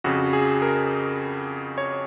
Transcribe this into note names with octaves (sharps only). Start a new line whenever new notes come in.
F2 C#3 F#4
G#4
A#4
C#5